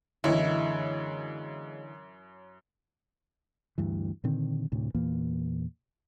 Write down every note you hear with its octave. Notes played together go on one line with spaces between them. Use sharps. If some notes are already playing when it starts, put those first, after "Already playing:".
F#2 D3 E3 G#3 A#3 E4 C#5
D2 G2 E3
A#2 D3 D#3 C4
D2 A2 C3
E2 A#2 E3 A#3